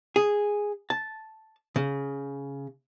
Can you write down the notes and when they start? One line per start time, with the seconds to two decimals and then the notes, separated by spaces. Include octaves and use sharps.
0.16 G#4
0.90 A5
1.76 C#3